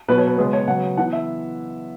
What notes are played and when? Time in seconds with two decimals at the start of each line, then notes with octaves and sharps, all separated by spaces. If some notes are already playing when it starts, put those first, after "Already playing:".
0.08 B2 F#3 B3 B4
0.18 C#5
0.27 B4
0.37 C#3 G#3 B3 G#4
0.53 C#5
0.67 C#3 F#3 B3 F#5
0.97 E3 B3 F#5
1.12 E5